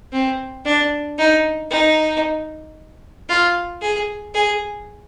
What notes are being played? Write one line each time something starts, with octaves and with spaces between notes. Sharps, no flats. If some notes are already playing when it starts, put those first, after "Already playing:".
C4
D4
D#4
D#4
F4
G#4
G#4